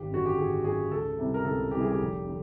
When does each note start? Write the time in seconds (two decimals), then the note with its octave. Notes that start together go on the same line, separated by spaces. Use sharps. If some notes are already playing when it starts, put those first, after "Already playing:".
Already playing: G#1 G4
0.10 F#2 D3 F#4
0.26 G4
0.37 G#1 G#4
0.64 F#2 D3 G#4
0.91 C#2 A4
1.19 C3 E3 G3
1.34 A#4
1.45 C#2 A4
1.71 C3 E3 G3 G4
1.81 G#4
1.90 G4
1.99 F1
2.27 D3